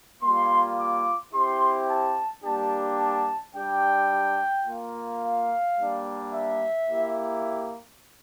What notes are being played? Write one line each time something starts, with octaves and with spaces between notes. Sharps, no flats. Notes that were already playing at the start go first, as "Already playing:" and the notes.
G3 A#3 F4 C6
D6
C4 E4 G4 C6
A5
G3 A#3 D4 G4 A5
A5
G3 D4 G4 G5
A#3 F4
F5
G3 A#3 D4
E5
A#3 E4 G4